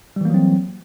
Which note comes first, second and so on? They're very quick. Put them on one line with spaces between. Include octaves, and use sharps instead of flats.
G3 E3 A#3 F#3 C4